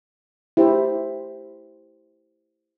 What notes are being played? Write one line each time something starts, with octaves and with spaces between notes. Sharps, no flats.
E4 G4 C5